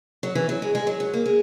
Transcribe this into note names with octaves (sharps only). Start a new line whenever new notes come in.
F#3
E3
F#3
G#3
G#3
F#3
F#3
A#3
G#3